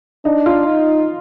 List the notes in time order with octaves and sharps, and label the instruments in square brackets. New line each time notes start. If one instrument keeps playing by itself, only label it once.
[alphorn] D4 [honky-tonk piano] D#4
[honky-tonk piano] F4
[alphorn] D#4